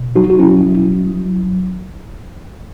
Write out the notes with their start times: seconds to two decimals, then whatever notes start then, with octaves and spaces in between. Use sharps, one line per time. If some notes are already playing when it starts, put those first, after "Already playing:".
Already playing: B2
0.16 F#3 D#4 F#4
0.30 F#4
0.39 C#4 E4
0.61 F#3
1.07 F#3